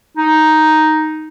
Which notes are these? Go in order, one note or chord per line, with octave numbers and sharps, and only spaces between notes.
D#4